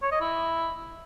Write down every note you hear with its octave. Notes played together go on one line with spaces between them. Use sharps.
C#5
D#5
E4